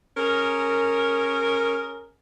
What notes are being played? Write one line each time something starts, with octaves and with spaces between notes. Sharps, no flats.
C#4 G#4 A#4